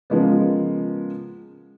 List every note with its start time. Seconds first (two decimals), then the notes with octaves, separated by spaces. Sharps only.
0.10 C#3 F3 G#3 A#3 B3